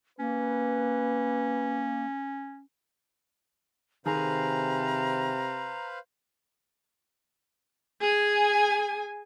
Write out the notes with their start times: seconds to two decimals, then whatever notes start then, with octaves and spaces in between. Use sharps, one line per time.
0.19 A#3 C#4 B4
4.06 C3 D#3 G#4 B4 C5 F5 G#5 A#5
8.01 G#4 G#5